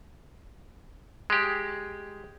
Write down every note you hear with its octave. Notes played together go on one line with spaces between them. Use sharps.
G#3 G4